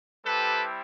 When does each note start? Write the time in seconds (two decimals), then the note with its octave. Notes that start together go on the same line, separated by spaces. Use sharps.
0.25 G3 C4 E4 G4 A4 B4